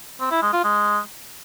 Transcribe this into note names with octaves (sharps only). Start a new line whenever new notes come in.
C4
E4
G#3
F4
G#3